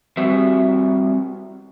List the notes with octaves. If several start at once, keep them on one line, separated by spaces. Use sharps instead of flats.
G3 C4 F#4 E5